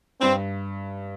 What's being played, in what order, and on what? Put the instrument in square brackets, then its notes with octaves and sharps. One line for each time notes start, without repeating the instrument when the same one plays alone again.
[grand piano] G2 [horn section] C4